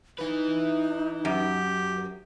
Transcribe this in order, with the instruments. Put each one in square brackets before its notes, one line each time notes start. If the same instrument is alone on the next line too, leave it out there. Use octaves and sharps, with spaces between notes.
[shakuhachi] D#4 [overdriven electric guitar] E4 B4
[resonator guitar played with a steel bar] F#2 [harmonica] G4